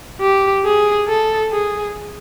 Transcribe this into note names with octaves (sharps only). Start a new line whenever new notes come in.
G4
G#4
A4
G#4